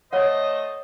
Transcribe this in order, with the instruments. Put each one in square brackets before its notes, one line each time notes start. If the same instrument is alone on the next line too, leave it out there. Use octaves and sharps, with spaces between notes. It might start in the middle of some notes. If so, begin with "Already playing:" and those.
[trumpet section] A3 C5 D#5 [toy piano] C#5 F#5